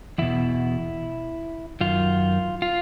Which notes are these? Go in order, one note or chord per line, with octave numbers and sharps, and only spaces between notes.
E2 B2 E4
F#2 D#3 F4
F4